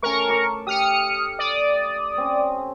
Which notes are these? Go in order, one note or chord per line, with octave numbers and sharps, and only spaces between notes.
A3 C#4 A#4 C#6
A5 D6
G4 D#6 F6 C#7
D5 D#6
C4 C#4